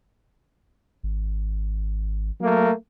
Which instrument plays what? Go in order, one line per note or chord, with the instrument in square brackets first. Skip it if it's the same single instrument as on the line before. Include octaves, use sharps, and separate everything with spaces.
[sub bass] G#1
[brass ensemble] F#3 A3 A#3